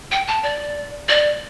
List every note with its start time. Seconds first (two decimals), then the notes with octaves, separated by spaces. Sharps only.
0.12 G5
0.28 A5
0.43 D5
1.09 D5